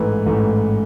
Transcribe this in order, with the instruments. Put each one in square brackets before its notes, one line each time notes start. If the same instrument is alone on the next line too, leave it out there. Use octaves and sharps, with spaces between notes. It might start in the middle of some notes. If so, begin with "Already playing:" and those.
Already playing: [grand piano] A1 G#2 E3 A3 B4
A1 G#2 E3 A3